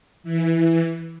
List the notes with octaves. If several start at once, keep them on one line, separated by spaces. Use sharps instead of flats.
E3